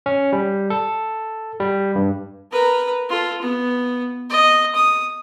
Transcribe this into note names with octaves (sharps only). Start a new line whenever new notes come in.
C#4
G3
A4
G3
G2
A#4 B4
F4 A4
B3
D#5
D#6